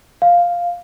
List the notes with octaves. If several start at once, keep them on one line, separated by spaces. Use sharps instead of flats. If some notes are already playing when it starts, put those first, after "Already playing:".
F5